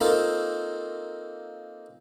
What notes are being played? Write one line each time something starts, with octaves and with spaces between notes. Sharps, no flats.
A#3 C4 D#4 F4 A4 C5